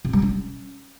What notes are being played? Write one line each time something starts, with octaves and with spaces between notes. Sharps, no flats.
C3
G3
C#4